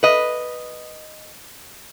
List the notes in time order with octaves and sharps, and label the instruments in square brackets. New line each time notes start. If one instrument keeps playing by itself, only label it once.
[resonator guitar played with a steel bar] B4 D#5